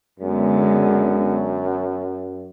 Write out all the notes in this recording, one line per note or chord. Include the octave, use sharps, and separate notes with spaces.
F#2 D3 G#3 B3